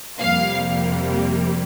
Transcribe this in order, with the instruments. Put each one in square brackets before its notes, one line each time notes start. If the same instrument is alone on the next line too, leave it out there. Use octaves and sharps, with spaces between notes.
[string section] F2 C3 G3 A#3 F5